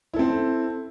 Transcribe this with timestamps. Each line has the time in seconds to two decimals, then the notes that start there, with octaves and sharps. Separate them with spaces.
0.14 E4
0.16 A4
0.19 C4